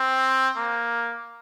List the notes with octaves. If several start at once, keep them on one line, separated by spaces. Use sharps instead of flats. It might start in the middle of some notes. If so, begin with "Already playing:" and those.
Already playing: C4
A#3